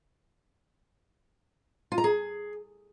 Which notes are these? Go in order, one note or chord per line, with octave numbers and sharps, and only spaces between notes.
F4
A#5
G#4